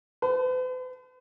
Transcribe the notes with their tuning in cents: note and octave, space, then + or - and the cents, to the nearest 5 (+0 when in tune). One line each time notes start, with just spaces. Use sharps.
B4 +45